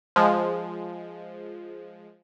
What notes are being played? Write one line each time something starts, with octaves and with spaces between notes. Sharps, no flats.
F3 G#3